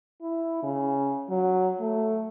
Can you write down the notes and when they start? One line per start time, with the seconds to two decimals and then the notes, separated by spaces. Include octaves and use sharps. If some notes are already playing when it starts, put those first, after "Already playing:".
0.22 E4
0.63 C#3
1.30 F#3
1.80 A3